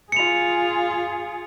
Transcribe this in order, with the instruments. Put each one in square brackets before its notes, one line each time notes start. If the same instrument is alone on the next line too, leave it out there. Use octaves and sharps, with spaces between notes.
[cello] F4 G#4 [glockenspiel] C#7 F7